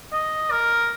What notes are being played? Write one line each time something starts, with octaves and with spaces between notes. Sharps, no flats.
D#5
A#4